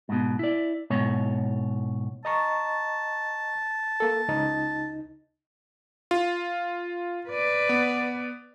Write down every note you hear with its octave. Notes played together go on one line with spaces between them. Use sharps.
G#2 B2
E4 D5
G#2 B2 C#5
D#5 A5 A#5 C#6
A#3 A4
C#2 D#4
F4
B4 D5
B3